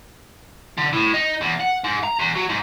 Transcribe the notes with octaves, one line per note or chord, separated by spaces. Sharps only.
D3
A2
D#4
E2
F#5
G#2
A#5
E2
F#3
G#2